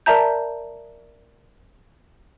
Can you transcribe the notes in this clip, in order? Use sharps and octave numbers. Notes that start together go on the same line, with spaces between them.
A#4 D5 E5 A5 A#5 G6